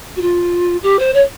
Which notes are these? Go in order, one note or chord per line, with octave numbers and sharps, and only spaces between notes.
F#4
F4
G4
C5
C#5